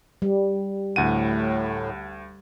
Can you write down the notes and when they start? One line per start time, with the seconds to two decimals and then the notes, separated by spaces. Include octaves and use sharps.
0.22 G3
0.96 D2 A2 F#5 D#7